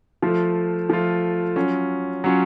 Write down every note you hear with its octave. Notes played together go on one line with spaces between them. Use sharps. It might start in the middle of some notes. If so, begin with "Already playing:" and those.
F3 A3 F4
F3 A3 F4
F#3 C#4 F4
F#3 C#4 F4